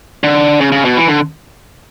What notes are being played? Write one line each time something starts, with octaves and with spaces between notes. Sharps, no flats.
D3
C#3
C#3
B2
E3
D3